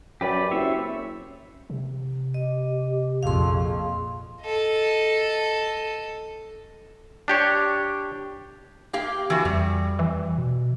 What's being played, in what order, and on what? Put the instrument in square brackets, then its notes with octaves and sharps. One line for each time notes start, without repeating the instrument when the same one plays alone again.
[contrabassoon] F#2 [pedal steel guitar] G4 B4 D5
[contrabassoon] F#1 [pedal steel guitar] C4 C#5 E5
[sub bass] C3
[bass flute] G4 [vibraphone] D#5
[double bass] A#1 F2 [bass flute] G#4 [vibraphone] F5 C6
[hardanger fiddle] A4 D#5
[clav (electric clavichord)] D4 G4 C#5
[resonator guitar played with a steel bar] A#3 G4 F5
E3 F#4
[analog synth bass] F2 [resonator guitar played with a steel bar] G3
[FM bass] E3
[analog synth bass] B2